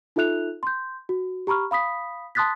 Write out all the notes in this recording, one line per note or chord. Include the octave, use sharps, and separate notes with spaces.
D#4 F4 A4 E5 F#6 F7
C6 G6
F#4
G4 A#5 B5 C#6 F6
F5 B5 D#6 B6
A5 C6 D#6 F#6 A6 B6